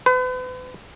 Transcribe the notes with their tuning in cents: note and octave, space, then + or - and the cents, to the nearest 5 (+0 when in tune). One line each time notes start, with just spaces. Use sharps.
B4 +40